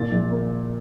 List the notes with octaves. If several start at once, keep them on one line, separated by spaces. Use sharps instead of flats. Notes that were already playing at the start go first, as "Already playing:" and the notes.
Already playing: A#2 A6
A#1
A#3